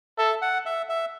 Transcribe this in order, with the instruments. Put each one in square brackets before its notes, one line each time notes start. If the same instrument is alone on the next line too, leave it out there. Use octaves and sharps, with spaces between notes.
[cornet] A4 [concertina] E5
[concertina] F#5
E5
E5